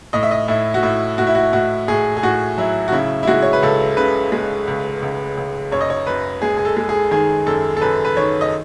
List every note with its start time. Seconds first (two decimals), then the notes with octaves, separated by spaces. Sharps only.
0.13 A2 D#5
0.23 E5
0.31 D#5
0.48 A2 E4
0.74 F#4
0.83 A2 E4
1.18 A2 F#4
1.27 E4
1.35 F#4
1.53 A2 F#4
1.88 A2 G#4
2.17 G#4
2.23 A2 F#4
2.58 F#3 E4
2.88 F#4
2.92 C#3 E4
3.23 E4
3.27 G#3 F#4
3.42 C#5
3.53 B4
3.63 C#2 A4
3.97 C#3 B4
4.32 G#3
4.68 C#2
5.02 C#2
5.37 C#2
5.72 F#2 C#5
5.81 D#5
5.90 C#5
6.07 F#2 B4
6.42 G#3 G#4
6.57 G#4
6.65 A4
6.77 G#3
6.89 G#4
7.11 D#3 G#4
7.46 F#2 A4
7.77 A4
7.81 F#2 B4
8.05 B4
8.17 D#3 C#5
8.41 D#5